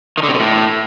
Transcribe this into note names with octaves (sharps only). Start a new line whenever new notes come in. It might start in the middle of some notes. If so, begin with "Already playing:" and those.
D#3
D3
C3
B2
A2